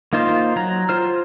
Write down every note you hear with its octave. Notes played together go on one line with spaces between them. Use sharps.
A#3 D#4 F4 C5
F#3 A#5
F4 C5 F6